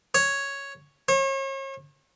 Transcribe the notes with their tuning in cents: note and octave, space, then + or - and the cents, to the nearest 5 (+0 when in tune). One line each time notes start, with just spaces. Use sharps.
C#5 +0
C#5 -40